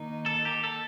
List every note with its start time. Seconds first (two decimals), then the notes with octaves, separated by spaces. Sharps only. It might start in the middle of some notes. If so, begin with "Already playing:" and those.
Already playing: D#3 A#3 D#4
0.26 A4
0.45 G4
0.64 A4